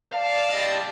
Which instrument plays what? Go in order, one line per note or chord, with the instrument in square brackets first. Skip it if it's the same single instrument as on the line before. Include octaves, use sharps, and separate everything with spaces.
[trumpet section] D5 A5 [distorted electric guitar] F5
[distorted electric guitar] G3 D#5